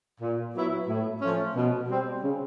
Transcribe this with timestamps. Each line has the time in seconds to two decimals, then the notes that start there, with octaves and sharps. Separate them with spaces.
0.21 A#2
0.54 F#3 B3 E4
0.88 A2
1.22 F3 A3 C#4
1.56 B2
1.89 G3 C4
2.22 C#3